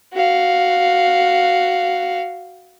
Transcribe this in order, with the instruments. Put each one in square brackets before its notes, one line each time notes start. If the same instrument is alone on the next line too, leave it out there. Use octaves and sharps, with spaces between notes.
[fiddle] F#4 F5